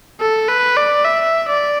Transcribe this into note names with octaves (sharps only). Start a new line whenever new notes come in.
A4
B4
D5
E5
D5